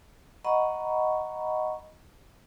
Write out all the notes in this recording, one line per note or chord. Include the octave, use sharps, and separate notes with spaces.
D#5 F#5 A#5 B5 C#6